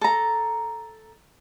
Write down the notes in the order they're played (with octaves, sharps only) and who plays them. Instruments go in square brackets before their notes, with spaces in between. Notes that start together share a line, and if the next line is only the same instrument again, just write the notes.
[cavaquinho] A4 A#5